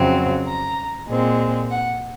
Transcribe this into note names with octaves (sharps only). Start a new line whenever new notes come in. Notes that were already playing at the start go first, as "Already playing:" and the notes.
Already playing: F2 C#3 F#3 C4
A#5
A#2 G#3 C4
F#5